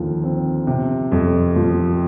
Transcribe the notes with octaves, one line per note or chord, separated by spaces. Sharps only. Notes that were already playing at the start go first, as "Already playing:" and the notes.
Already playing: D#2 D3 F3
C4
C3
F2
F3